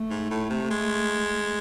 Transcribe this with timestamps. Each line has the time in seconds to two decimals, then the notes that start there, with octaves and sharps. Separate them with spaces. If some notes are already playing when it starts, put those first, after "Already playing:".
Already playing: A3
0.10 G#2
0.31 A2
0.50 C3
0.71 G#3